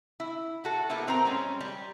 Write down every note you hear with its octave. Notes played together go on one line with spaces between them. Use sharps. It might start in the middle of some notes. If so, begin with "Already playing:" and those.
E4
E4 F#4 A4
A#3 B3 E4 G4 A4
A#2 C4 A#4 A#5
G3 G#3 C4 C#4
G3